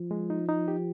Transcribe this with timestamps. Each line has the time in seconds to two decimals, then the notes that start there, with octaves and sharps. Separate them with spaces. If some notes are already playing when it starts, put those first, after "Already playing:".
Already playing: F3
0.11 G#3
0.30 D#4
0.49 D#4
0.68 G4